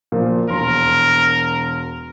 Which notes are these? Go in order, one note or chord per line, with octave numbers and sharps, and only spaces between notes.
A#2 F3 A#3
E1 A#4 C6